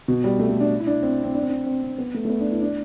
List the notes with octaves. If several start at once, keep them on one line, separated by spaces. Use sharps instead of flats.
B2
G3
A3
A3
D4
E4
D4
C4
C4
D4
C4
D4
C4
C4
B3
A3
A3
B3
D4
E4
D4